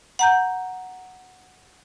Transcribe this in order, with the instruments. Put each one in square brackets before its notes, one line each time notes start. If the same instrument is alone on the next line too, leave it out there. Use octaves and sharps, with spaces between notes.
[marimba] F#5 A#5 G6